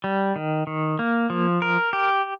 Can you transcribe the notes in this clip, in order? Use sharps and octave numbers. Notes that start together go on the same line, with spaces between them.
G3
D#3
D#3
A#3
F3
A#4
G4